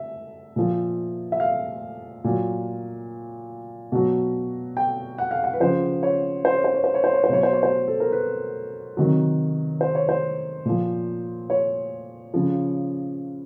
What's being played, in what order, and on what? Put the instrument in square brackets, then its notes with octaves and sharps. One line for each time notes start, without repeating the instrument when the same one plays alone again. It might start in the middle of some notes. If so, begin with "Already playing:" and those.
Already playing: [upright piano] E5
A#2 F3
E5
F5
A#2 F#3
B2 F#3
G5
F#5
F5
F#5
B4
C#3 F3 C5
C#5
C5
C#5
C5
C#5
C5
C#5
C5
C#5
C5
B2 F#3 C#5
C5
C#5
C5
A4
A#4
B4
C3 D#3 F#3
C5
C#5
C5
A#2 F3
C#5
C#3 F3